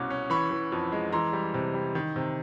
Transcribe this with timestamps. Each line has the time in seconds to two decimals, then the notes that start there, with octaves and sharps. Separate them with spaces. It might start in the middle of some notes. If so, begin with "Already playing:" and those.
Already playing: C2 B2 C#4 D6
0.10 C#4
0.30 E3 B5 C#6
0.51 E3
0.72 F2
0.92 G#3
1.12 E3 A#5 C6
1.33 G3
1.54 C3
1.74 G3
1.95 D#3
2.16 C3